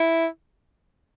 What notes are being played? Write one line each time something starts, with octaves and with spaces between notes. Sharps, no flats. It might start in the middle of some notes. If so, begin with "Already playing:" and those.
Already playing: E4